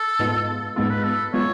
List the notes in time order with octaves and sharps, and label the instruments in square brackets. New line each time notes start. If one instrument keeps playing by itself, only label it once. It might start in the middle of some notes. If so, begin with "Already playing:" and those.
Already playing: [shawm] A4
[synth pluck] G#2 G#3 B3 F4
[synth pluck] G#2 G#3 B3 F4 [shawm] A4
[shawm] B4
A4
[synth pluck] G#3 B3 F4 [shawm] C#5